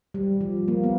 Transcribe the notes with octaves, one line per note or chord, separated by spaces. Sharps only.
G3
F3
A#3
B3